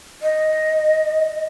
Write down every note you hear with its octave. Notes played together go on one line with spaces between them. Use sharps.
D#5